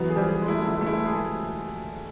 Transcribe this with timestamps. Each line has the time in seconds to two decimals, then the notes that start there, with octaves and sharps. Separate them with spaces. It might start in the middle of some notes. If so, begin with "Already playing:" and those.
Already playing: E3 F#3 B3
0.10 G#4
0.16 F3 G3
0.29 G#4
0.41 G#3
0.48 A3 E4
0.58 G#3
0.65 A3 E4
0.73 G#3
0.81 A3
0.87 G#3 E4
0.97 A3
1.05 G#3 G#4
1.13 A3